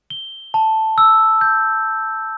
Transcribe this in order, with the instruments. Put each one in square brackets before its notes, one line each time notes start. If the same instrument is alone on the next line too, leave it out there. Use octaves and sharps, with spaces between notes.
[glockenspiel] G7
A5
E6
G6